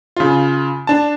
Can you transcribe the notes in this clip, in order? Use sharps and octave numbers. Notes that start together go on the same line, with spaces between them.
C#3 F4
D4 A5